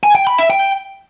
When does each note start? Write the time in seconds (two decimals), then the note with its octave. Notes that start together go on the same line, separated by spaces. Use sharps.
0.03 G#5
0.15 G5
0.27 B5
0.38 E5
0.50 G5